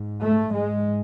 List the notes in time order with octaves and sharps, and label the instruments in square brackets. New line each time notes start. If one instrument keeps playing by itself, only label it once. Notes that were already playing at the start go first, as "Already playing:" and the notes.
Already playing: [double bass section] G#2
A3
G#2 G#3